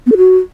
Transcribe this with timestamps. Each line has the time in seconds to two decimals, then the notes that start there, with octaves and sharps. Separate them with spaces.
0.06 B3
0.12 A4
0.17 F#4